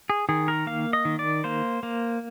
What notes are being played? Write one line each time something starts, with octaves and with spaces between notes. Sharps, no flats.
G#4
D#3 G#4
A#4
A#3 F5
D#5
D#3
D5
A#3 C5
A#3